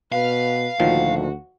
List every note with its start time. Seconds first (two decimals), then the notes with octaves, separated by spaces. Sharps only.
0.12 B2 B4 F5
0.80 D2 A#2 D#3 F3 F#4